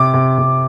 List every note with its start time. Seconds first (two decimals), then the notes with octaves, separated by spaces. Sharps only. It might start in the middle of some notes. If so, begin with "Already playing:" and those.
Already playing: C3 D6
0.14 C3
0.38 C3